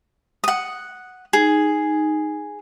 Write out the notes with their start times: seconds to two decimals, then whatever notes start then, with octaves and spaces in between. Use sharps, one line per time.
0.44 F#5 D#6
1.33 D#4 G#4